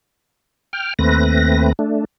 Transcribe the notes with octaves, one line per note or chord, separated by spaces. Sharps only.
G5 F6
D#2 A3 C4 B4 A#6
A3 D4